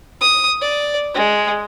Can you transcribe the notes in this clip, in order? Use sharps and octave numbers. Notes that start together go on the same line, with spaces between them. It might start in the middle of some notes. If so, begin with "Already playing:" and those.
D#6
D5
G#3